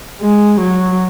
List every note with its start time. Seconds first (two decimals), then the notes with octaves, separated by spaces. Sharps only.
0.21 G#3
0.60 F#3